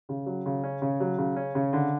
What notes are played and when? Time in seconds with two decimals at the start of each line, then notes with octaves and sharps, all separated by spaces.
0.09 C#3
0.26 F#3
0.46 C#3
0.63 C#4
0.82 C#3
1.00 F#3
1.18 C#3
1.36 C#4
1.55 C#3
1.73 D3